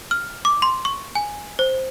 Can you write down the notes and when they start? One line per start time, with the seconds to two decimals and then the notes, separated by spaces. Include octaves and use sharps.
0.11 F6
0.45 D6
0.62 C6
0.85 C#6
1.15 G#5
1.59 C5